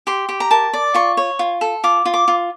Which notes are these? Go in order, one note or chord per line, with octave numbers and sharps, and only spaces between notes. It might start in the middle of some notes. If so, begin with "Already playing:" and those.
G4 C6
G4
A#5
A#4 A5
D5
F4 C#6
C#5
F4
A4
F4 D6
F4
D6
F4